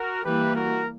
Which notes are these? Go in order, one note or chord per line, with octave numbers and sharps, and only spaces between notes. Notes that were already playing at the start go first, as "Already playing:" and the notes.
Already playing: F#4 A#4
E3 G3 A#3 G4 B4
F#4 A#4